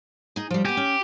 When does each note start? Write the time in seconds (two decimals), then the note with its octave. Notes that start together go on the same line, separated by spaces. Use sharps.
0.36 D#4 G#4
0.50 F3 G3
0.65 B3 G4 G#5
0.77 C#4